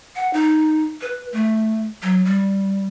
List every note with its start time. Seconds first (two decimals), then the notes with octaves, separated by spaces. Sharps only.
0.16 F#5
0.33 D#4
1.01 B4
1.32 A3
2.02 F#3
2.25 G3